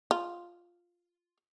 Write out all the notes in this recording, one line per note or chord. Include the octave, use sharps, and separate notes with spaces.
F4